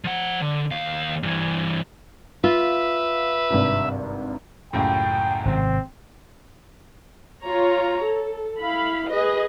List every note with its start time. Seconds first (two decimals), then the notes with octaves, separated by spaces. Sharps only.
0.04 F3 F#5
0.42 D3
0.71 D#2 F5
1.23 G2 E3
2.44 F4 B4 E5 F5
3.50 G#1 G2 C3
4.73 C#2 F#2 A2 G5
5.45 G#1 C3 C4
7.45 F4 C#5 A#5
8.05 A4
8.62 E4 F5 B5
9.12 G#4 B4 D#5